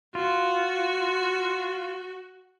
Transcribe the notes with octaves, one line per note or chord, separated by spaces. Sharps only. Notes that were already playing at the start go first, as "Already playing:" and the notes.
F4 F#4